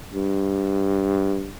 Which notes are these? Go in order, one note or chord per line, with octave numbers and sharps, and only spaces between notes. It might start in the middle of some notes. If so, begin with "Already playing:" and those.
G2